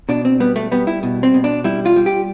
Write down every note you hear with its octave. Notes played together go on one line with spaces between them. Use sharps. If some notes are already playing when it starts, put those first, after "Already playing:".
B2 D4
C4
G3 B3
A3
G3 B3
E4
B2
C4
B2
D4
G3 E4
F4
G3
G4